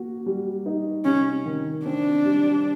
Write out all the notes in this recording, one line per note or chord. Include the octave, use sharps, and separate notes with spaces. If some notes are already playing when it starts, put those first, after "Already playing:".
Already playing: A#3 F#4
G3
D#4
C3 C#4
D#3
C4 D4
G3